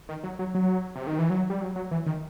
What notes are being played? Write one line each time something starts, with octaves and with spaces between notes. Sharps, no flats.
D#3
F#3
F#3
F#3
C3
D#3
E3
F#3
G3
F#3
F#3
E3
D#3